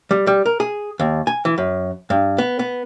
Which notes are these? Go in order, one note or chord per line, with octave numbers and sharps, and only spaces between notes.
G3
G3
A#4
G#4
D#2
G#5
E3
F#2
G2
B3
B3